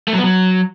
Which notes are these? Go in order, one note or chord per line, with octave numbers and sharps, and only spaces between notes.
A3
F#3
B3
F#3